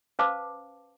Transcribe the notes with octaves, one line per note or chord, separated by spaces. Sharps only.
C#4 B4 C5 F5 A5 D6